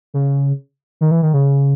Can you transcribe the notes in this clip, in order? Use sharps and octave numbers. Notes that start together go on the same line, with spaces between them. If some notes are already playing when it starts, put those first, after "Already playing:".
C#3
D#3
E3
D#3
C#3